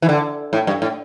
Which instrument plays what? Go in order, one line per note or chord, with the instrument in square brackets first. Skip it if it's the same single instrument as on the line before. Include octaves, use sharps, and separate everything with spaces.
[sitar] E3
D3
A2
G2
A2